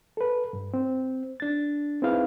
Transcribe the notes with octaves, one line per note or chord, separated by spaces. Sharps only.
A4 B4
G2
C4
D4 A6
C4 D#4 E4 G#4 B4 F5